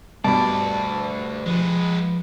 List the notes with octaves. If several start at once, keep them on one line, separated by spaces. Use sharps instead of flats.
D2 G2 B2 D5 A5 B5
F3 G#3 B4